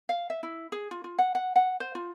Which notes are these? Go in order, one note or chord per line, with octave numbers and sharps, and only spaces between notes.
F5
E5
E4
G#4
F4
F4
F#5
F#5
F#5
C5
F4